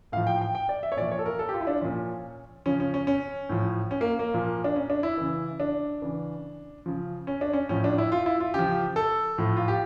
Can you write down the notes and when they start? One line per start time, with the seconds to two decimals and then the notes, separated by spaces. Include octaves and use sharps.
0.12 A2 F3 F5
0.27 G5
0.41 G5
0.55 G5
0.69 D5
0.83 E5
0.92 C#5
0.97 A#2 F3 D5
1.12 C#5
1.19 A4
1.26 A#4
1.39 A4
1.49 G4
1.54 F4
1.61 E4
1.67 D4
1.81 A#2 F3 C#4
2.66 C#3 F3 C#4
2.80 C#4
2.94 C#4
3.07 C#4
3.49 A2 F3
3.91 C#4
4.01 A#3
4.19 A#3
4.34 A#2 F3
4.64 D4
4.76 C#4
4.90 D4
5.03 E4
5.18 C#3 E3
5.60 D4
6.02 C#3 E3
6.86 C#3 F3
7.27 C#4
7.41 D4
7.53 C#4
7.69 A2 F3 C#4
7.84 D4
7.98 E4
8.12 F4
8.26 E4
8.40 F4
8.54 C#3 F3 G4
8.96 A4
9.38 A2 F3
9.57 F4
9.68 G4